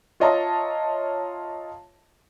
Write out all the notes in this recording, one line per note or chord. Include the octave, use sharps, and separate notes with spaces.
F4 C#5 D#5 E5 A5 A#5